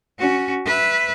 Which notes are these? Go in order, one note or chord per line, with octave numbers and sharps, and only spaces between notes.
C#4 F#4
B4 E5